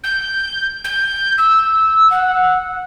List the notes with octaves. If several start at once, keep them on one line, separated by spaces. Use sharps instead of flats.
G6
G6
E6
F#5